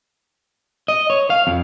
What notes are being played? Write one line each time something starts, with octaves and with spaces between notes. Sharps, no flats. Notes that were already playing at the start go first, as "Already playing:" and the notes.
D#5
C#5
F5
F2